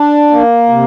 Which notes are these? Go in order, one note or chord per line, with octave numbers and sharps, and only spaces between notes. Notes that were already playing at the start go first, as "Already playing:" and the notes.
Already playing: D4
A#3
C3